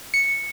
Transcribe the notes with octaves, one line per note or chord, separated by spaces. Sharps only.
C#7